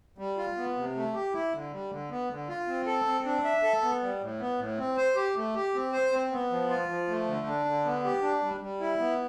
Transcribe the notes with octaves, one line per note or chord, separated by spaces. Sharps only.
G3
F4
B3
C3
A3
G4
E4
D3
G3
D3
B3
D3
F4
C4
A4
C4
D4
E5
A4
B3
G3
A2
B3
A2
C4
C5
G4
A3
G4
C4
C5
C4
B3
F3
F4
F3
A3
D3
D4
D3
B3
G4
D4
G3
G3
E4
B3